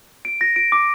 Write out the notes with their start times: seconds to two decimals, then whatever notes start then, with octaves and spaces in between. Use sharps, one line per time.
0.25 D7
0.41 A#6
0.56 D7
0.72 D6